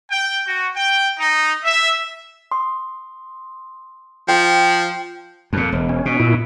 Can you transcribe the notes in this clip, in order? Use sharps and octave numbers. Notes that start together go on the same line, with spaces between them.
G5
F#4
G5
D#4
E5
C6 D#6
F3 G5
F2 A#2
E1
C#4
B2
A#2 E4